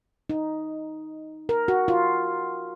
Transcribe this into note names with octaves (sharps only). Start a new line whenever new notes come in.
D#4
A#4
F#4
F4